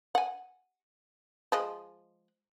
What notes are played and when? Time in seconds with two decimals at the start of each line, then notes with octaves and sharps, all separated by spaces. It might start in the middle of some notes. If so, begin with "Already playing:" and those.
0.15 F#5 G#5
1.52 F3 G#3 D#5